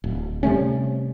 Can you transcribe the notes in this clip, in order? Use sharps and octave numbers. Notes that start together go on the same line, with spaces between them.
D1
C3 G3 A3 C#4